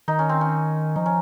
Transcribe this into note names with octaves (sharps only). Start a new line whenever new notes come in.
D#3 D#4
C#4
C4
C#4
F3 D#4
C#4